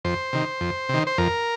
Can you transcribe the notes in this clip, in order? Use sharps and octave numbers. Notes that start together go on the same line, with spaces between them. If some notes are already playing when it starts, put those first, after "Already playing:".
F2 C5
C3 D#3
F2
C3 D#3
C5
F2 A#4